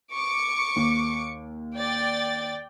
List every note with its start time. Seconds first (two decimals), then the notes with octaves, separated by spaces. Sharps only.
0.14 C#6 D6 C#7
0.76 D#2
1.77 D5 G5 A6